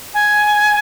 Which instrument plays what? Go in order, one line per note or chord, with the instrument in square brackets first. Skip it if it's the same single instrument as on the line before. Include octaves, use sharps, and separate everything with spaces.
[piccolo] G#5